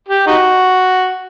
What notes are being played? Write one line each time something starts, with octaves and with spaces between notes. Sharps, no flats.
G4
D#4 F#4